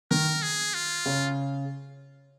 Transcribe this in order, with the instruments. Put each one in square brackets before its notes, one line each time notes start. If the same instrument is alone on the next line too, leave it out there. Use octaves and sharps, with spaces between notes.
[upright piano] D#3 [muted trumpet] A#4
[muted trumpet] G#4
F4
[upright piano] C#3